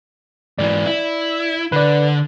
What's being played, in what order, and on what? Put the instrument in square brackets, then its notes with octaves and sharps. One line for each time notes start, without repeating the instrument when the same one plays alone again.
[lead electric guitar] G#2 E3 [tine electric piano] D5
[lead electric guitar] E4
[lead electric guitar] D3 [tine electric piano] B4 D5